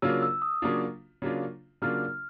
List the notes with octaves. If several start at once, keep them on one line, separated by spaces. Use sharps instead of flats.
C#3 F#3 A#3 D4 F4 E6
E6
D#6
C#3 F#3 A#3 D4 F4
C#3 F#3 A#3 D4 F4
C#3 F#3 A#3 D4 F4 F6